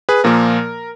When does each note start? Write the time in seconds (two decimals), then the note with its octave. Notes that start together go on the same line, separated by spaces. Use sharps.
0.09 G#4 B4
0.24 A#2 F3 A#3 A#4